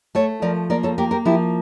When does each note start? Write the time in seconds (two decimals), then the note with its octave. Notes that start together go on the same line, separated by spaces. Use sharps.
0.15 A3 A4 C#5
0.42 F3 A#4 D5
0.70 A#3 A#4 D5
0.83 A4 C#5
0.98 A#3 G4 A#4
1.11 G4 A#4
1.25 F3 E4 G4